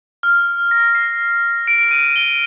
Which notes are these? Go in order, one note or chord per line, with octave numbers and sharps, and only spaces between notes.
F6
A#6
C7
D7
D#7
G7